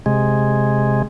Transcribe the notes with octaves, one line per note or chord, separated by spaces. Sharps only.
C3 G#3